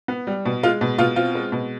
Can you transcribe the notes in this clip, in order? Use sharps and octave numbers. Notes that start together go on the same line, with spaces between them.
B3
G3
B2
G#3 F4
B2
B2 F4
C4 F4
G#3
B2